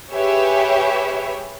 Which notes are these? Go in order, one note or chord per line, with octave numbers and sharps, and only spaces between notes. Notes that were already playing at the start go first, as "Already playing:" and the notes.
G4 G#4 B4 C#5 E5